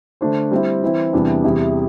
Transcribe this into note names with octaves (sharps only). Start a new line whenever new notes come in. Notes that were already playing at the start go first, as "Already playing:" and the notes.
D3 A3 D4 C5
G3 C4 E4
E3 C4 E4
E2 C3 E3 G3 D4
E2 C3 G3 E4